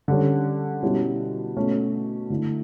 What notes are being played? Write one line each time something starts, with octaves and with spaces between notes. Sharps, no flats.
D3 G3 C#4
B2 G3 C#4 E4
B2 A3 C#4
D3 A3 E4